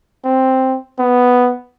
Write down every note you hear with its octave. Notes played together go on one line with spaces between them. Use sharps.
C4
B3